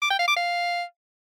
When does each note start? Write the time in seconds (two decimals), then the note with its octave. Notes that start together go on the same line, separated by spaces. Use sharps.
0.02 D6
0.10 G5
0.19 F5
0.28 D6
0.36 F5